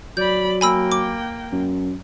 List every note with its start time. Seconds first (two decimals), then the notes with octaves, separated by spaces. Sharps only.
0.17 F#3 D5 B5 G6
0.61 A#3 G5 G#5 B5 E6
0.92 D6
1.52 F#2